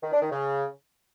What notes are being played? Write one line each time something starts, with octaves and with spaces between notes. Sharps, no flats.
D#3
D4
D#3
C#3